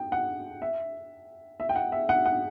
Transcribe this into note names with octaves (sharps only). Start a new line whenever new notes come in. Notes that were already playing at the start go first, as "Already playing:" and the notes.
Already playing: G5
F#5
E5
E5
G5
F#5
E5
F#5
F#5